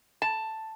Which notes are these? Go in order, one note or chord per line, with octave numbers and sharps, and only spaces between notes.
A5